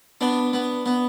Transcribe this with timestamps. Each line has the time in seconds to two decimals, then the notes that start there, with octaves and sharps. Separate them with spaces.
0.21 B3 D4
0.53 B3
0.86 B3